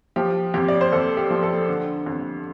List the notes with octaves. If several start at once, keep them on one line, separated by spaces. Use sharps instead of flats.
F3 G4
F2 G4
D5
C5
F2 A4
G4
F3
A4
D3
F2